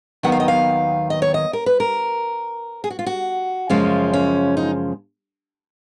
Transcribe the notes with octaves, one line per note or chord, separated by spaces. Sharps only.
D#2 D#3 F#3 B3 F#5
F5
D#5
F5
D#5
C#5
D#5
A#4
B4
A#4
G#4
F#4
F4
F#4
F#2 C#3 F3 G#3 C#4 F4
C#4
D#4